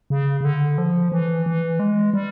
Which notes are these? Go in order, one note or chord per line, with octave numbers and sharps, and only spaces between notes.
C#3
C#3
D3
F3
E3
E3
G#3
G3